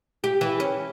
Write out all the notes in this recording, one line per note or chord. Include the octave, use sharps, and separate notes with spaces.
G4
E3
C#4